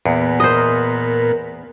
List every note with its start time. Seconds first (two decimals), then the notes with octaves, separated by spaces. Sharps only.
0.06 E2 A#2 B3
0.40 A#4 C5 D#5